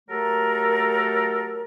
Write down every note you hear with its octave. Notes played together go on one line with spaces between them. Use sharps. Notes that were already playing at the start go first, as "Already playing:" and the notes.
F#3 A3 G4 A4 A#4